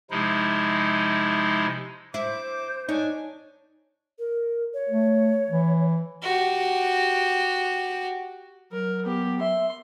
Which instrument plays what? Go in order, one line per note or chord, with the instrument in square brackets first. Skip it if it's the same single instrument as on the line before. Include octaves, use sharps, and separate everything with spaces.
[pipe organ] C3 F3 G#3 D#4 E4
[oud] E4 [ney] C5 [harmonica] D6
[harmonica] D4 G#5 [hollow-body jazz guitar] D#4 [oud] C#5
[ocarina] A#4
C#5
[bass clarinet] A3
E3
[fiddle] F#4 G4
[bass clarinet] F#3 [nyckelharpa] A#4
[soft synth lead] B3 [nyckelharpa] G4
[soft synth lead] E5 [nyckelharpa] C6